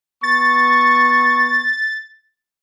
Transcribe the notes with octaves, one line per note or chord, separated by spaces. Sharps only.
B3 C#6 A6